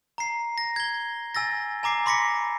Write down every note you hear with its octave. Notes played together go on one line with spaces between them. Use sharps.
A#5 C7
A#6
G#6 G7
G#5 E6 A6 A#6
G#5 A#5 D6 C7
B5 C6 D6 A#6 B6 C#7